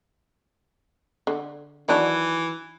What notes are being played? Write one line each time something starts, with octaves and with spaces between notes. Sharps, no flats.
D3
D#3 E3 F#3 D4